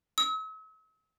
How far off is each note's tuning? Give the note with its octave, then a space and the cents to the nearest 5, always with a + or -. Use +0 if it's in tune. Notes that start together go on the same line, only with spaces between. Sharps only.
E6 -45